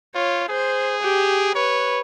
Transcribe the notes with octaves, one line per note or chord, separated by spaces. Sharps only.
F4 C#5
G#4 C5
G4
B4 C#5